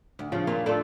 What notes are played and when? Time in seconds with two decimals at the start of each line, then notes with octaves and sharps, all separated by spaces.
0.19 D2
0.32 C#3 F3
0.47 A#2 F4
0.66 A3 D4 F4 A4